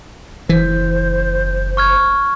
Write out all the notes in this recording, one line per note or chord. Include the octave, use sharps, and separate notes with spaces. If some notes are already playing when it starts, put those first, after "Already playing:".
F#1 E3 C5
C#6 F6 G#6